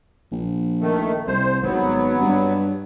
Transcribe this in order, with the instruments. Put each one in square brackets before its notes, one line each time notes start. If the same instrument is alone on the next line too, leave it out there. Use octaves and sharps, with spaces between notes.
[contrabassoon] A#1
[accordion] D#3 A3
[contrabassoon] C2 [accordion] C5
[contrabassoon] G#1 [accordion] F#3 B3
[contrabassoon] G2